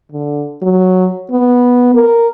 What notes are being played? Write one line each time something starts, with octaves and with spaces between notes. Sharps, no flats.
D3
F#3
B3
A#4